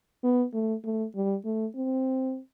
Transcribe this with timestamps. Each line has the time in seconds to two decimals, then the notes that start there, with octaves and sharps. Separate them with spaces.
0.24 B3
0.54 A3
0.84 A3
1.15 G3
1.45 A3
1.76 C4